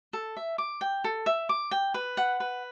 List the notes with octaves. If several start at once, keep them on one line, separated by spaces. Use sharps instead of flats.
A4
E5
D6
G5
A4
E5
D6
G5
B4
F#5
B4